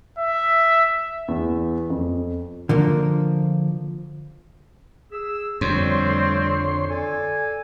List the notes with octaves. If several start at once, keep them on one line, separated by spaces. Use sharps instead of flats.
E5
E2
F2
D3 F3 A#3
G#4 E6
F2 D3 G3 A3 C4 C#5 C6
A4 D5 G#5